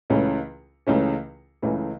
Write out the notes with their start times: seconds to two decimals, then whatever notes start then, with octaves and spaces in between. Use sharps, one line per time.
0.10 C#2 C#3 E3 A3 C#4
0.87 C#2 C#3 E3 A3 C#4
1.62 C#2 C#3 E3 A3 C#4